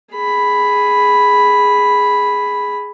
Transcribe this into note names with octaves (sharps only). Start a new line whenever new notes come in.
G#4 B5